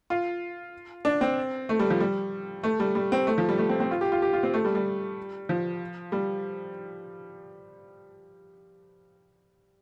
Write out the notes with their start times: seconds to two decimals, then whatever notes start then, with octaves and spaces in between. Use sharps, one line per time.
0.10 F4
1.05 D4
1.21 C4
1.69 A3
1.79 G3
1.90 F3
2.00 G3
2.63 A3
2.80 G3
2.95 G3
3.12 C4
3.27 A3
3.38 F3
3.49 G3
3.58 A3
3.69 C4
3.80 C4
3.91 F4
4.01 G4
4.12 F4
4.22 G4
4.33 F4
4.43 C4
4.54 A3
4.65 G3
4.75 G3
5.49 F3
6.12 G3